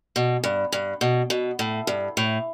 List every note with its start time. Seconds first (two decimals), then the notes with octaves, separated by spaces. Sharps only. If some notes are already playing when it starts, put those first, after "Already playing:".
0.16 B2
0.44 G2
0.72 G2
1.01 B2
1.30 B2
1.59 A2
1.87 G2
2.17 A2